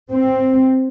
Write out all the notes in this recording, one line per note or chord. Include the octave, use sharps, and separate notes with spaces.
C4